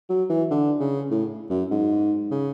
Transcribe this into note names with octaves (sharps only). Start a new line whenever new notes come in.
F#3
E3
D3
C#3
A2
F#2
G#2
C#3